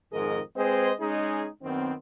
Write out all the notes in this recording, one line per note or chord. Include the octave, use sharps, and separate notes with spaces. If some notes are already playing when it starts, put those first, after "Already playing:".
F2 G#2 D#3 G#4 A#4 D#5
G#3 C4 G#4 B4 C5 D#5
G#3 C#4 D#4 G#4
F#2 D#3 B3 C4